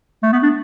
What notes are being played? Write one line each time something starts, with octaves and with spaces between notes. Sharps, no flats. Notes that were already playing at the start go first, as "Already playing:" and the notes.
A3
B3
D4